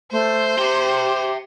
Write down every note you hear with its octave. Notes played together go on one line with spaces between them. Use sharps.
A3 C5
G4 E5 G5